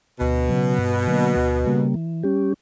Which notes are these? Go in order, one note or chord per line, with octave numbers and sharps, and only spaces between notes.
D2 B2
C#3 F#3
G2
D3 F#3 A#3
D2
C#3 G3 A#3
E3
G3 C#4 G4